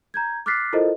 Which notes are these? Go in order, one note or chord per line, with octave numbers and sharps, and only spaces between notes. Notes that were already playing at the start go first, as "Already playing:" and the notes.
A#5 G6 G#6
D6 F6 F#6 A6 B6 C7
E4 F4 A4 A#4 C5 D#5